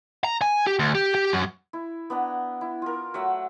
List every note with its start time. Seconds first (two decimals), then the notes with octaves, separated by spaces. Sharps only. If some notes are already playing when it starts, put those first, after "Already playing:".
0.24 A#5
0.42 G#5
0.67 G4
0.79 D2
0.95 G4
1.15 G4
1.32 F#2
1.73 E4
2.10 B3 D4 A#5
2.61 E4
2.82 F4 A#4
3.14 F#3 A3 E5 F#5